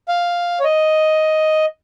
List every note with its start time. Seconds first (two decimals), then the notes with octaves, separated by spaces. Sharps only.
0.08 F5
0.60 C#5
0.64 D#5